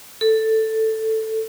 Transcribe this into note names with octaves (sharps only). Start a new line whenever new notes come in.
A4